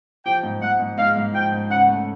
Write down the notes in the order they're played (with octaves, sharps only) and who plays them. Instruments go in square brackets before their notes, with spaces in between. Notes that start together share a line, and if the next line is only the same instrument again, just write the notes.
[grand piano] F3 [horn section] G5
[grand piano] G#2
[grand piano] G#2 [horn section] F#5
[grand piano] G#2
[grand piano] G#3 [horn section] F5
[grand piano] G#2
[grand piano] F3 [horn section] G5
[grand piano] G#2
[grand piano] C#3 [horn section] F#5
[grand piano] A3